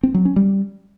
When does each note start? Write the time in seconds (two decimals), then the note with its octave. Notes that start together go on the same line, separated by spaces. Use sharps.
0.03 C4
0.14 F#3
0.25 C#4
0.36 G3